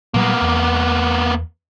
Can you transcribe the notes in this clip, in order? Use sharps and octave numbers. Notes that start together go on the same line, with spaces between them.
A#2 F#3 G3 A#3 B3
E2